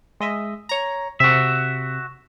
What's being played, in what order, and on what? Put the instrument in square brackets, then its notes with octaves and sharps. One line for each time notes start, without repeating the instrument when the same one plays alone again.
[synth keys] G#3 D#5 E5
C#5 A#5
[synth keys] C3 [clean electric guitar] F#4 E5